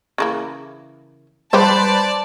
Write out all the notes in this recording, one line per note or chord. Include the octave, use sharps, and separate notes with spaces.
C#3 E3 A#3
F3 G3 G#3 G4 B4 C5 D5 A5